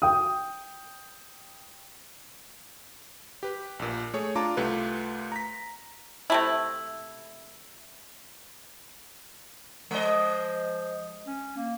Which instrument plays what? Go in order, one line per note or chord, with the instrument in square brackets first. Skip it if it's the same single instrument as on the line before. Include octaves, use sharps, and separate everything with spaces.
[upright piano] G5 D#6
[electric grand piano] G4 B4
A#1 A#2
A3 G#4 C#5
D4 F4 A5 A#5 D6
C2 A3 F4 G4 B4
A#5 B6
[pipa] C3 A3 E4
[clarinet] F3 [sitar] G#3 D#5
[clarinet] C#4
A#3